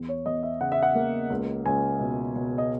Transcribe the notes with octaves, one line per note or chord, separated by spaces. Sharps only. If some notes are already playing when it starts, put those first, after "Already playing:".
Already playing: E2
C#5
E2 D#5
E5
C#3 F#5
E5
F#5
A#3
C#2
C#2 G#5
B2
B2
D#5